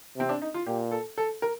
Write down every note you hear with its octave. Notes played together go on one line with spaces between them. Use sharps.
C3 C4
D4
D#4
F4
A#2 G4
A4
A4
A#4